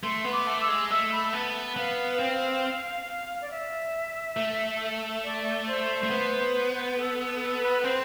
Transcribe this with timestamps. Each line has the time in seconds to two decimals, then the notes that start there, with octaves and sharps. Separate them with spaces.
0.04 A3 C6
0.25 B3
0.33 D6
0.47 A3
0.61 E6
0.68 G#3
0.90 A3 E6
1.12 B5
1.33 B3 A5
1.76 B3 F5
2.19 C4
3.42 D5
3.51 E5
4.37 A3
5.24 D5
5.67 C5
6.03 A3
6.10 B3
6.97 A4
7.19 A4
7.40 A4
7.62 B4
7.84 C4 C5